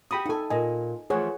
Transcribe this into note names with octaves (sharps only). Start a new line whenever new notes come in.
F#4 G4 G5 B5 D#6
D#4 A4 F#5 G#5
A#2 D#5 G#5
E3 F3 A3 G#4 C#5 F#5